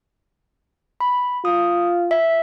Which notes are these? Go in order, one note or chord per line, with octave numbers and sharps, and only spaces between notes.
B5
F4 D#6
E5